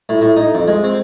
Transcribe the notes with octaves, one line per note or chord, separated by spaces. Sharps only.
A2
A2
D#4
F2
G#3
C4